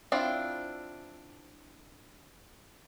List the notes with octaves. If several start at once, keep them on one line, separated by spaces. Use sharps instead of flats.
C4 D4 E4 F4